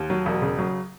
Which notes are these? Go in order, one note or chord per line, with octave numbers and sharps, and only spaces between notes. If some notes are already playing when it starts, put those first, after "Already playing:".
Already playing: D#2
F#3
E1
C#3
F#3